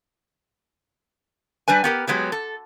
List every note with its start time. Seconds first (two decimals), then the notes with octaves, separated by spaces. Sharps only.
1.68 G3 D4 B4 G#5
1.84 B3 G4 A#4
2.07 F#3 G#3 B3 G4
2.32 A4